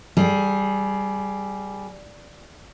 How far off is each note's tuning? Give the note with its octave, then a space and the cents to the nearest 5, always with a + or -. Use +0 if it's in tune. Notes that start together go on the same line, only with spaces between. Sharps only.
G3 +0 G#4 +20